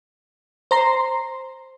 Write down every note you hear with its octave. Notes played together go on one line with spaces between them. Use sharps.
C5 A#5 C6